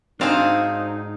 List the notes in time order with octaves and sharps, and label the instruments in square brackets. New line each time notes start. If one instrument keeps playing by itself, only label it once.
[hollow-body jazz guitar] G#2 D4 [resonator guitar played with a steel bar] C4 F#4 C5 [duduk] D#4 [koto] G#4 F5